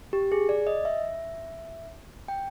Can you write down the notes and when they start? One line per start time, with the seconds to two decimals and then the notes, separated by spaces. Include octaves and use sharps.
0.13 G4
0.32 G#4
0.49 D5
0.67 D#5
0.85 E5
2.28 G5